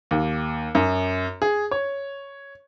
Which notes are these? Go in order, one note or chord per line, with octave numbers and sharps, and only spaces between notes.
D#2
F#2
G#4
C#5